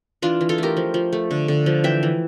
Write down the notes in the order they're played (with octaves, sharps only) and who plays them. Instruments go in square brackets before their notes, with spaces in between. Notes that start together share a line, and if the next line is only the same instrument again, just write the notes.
[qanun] E3 D4 F4
E3
F4 A4
A3 G4 A#4
F3
F3
A3
D3
D3
F3
E3 E5 G5
E3